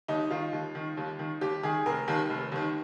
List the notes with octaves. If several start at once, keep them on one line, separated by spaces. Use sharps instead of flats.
D#2 D#4
D#3 F4
D#2
D#3
D#2
D#3
D#2 G4
D#3 G#4
F1 A#4
D#2 D#3
F1
D#2 D#3